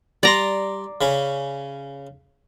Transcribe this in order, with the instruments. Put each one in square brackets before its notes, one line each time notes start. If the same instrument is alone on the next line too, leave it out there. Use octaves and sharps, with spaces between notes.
[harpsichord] G3 C6 [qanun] D5 A#5
[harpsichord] C#3 C#4 B5